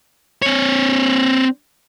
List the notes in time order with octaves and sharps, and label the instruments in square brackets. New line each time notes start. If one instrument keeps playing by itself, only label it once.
[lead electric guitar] C4 C#5